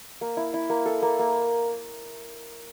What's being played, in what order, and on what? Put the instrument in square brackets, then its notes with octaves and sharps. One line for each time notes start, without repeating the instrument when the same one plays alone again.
[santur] A#3
E4
E4
A#3
A4
A#3
A#3